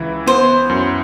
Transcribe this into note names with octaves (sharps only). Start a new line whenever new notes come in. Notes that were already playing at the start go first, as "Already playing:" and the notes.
Already playing: C#2 E3 E4
B3 C5
F#2